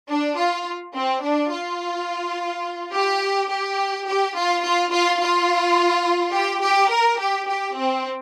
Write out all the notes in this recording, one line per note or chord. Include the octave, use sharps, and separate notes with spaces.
D4
F4
C4
D4
F4
G4
G4
G4
F4
F4
F4
F4
G4
G4
A#4
G4
G4
C4